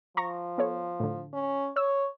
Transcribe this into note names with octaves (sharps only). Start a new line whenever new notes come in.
F3 A#5 C#6 A#6
B3 A4 C#5
A2 D3
C#4
C#5 E6